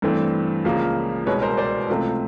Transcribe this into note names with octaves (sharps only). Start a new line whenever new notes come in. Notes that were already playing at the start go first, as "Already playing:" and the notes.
G2 E3 A3 C4
C#2 C#3 F3 A#3
C2 B2 G#3 B3 B4 C#5
A#4 C5
C5 D5
C#2 C3 F3 A3 C4